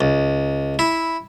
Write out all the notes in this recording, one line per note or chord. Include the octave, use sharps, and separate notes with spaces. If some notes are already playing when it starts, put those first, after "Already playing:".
C#2
E4